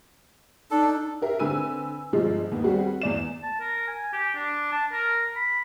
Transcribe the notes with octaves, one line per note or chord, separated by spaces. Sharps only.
D4 D#4 A4
G4 A#4 E5
D3 C4 B4 G#5 E6 D#7
G1 F3 G#3
D#2 B3
G3 C4 F#4 G#4 B4
E2 D5 E7
A5
A#4
G#5
G4
D4
A5
A#4
B5